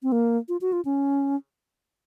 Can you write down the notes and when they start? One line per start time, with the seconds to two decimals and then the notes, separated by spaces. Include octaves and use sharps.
0.03 C4
0.12 A#3
0.49 F4
0.61 F#4
0.73 F4
0.85 C#4